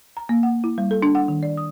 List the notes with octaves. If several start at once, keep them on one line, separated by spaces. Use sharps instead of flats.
A#5
A#3
F#5
E4
G3
A4
D4
F#5
D#3
D5
D#6